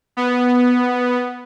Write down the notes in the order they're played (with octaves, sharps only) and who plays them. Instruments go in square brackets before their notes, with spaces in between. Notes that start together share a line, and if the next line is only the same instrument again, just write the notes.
[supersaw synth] B3